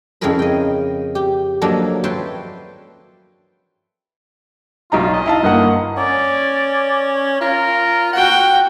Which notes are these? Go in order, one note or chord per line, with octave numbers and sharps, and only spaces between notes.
F2 C#3 E4 G#4 A#4 B5
D#5 G5
G4
F3 F#3 A#3 D4 A4 D#5
B4 C#5 E5 G5 A5 C6
B1 D#4 F4 A#5
D#5
E4 F5 A5
G1 A#3 F#5
C#4 D5
F4 A#4
F#4 F#5 G5